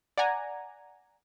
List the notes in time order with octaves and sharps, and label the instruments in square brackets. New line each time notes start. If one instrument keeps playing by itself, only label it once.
[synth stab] D5 F#5 G#5 A#5